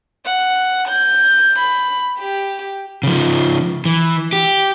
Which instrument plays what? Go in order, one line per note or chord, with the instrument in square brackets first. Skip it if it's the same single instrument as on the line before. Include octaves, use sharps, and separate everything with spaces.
[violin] F#5
G6
B5
G4
[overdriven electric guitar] C#3 F3
E3
G4